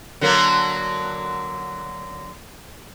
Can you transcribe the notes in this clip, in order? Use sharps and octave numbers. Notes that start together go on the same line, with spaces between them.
D3 F#3 A#3